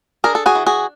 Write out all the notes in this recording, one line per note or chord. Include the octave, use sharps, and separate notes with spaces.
D4 G#4 A#4
A4
F#4 G#4
E3
F#4 G#4